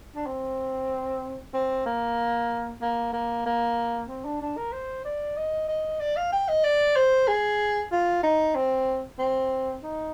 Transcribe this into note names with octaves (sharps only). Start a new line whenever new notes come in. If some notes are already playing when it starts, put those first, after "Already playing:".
D4
C4
C4
A#3
A#3
A#3
A#3
C4
D4
D4
A#4
C5
D5
D#5
D#5
D5
F5
G5
D#5
D5
C5
G#4
F4
D#4
C4
C4
D#4